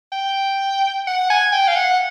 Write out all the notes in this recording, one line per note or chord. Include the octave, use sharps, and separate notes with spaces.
G5
F#5
G#5
G5
F5
F#5